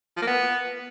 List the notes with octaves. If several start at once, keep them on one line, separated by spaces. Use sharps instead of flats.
F3
A#3
B3